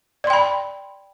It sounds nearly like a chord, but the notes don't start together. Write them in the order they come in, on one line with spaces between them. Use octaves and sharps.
D5 C6 G5 B5